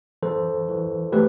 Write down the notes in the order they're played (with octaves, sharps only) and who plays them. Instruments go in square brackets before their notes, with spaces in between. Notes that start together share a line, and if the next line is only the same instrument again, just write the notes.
[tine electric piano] E3 A4 C5
E3
A3 G4 B4